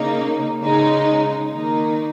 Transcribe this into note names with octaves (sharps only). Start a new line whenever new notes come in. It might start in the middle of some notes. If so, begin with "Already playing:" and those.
Already playing: C#3 A#3 D#4
C#3 G#3 D#4
D#3 A#3 D#4